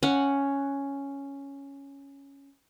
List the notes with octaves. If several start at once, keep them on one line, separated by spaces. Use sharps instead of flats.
C#4 F#5